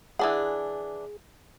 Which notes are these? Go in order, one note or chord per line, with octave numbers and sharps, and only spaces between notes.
E3 D4 G#4 F#5